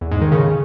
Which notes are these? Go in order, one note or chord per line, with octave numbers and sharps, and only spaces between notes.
E2
G#2
D#3
C#3